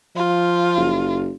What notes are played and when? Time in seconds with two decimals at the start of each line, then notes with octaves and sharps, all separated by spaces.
0.16 F3 F4
0.77 F#1